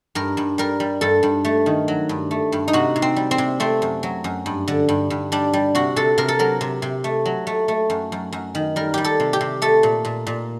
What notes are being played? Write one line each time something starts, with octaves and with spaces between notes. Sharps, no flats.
G2 A#4
G2
G3 A#4
G3
G2 A4
G2
A3
D#3
F#3
G2
A3
G2
D#4
C3 F#4
C3
C4
G3
C4
C3
A3 C4
F#2
F#3
F#2
G2
D3
G2
G2
G3 D4
G3
C3 F#4
C3 A4
C3 A#4
A4
F#3 A#4
C3
C3
A3
F#3
A3
A3
F#2
F#2
F#2
D#3
G3 A#4
G3 G4
A4
C3
G4
C3
A3 A4
A#2
A#2
A#2